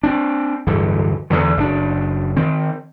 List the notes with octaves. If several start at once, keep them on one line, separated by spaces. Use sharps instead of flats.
C4 D4
D1 G2 D3 E3
E2 G#2 D3 E3
F#1 D#3 D4
D#3 C4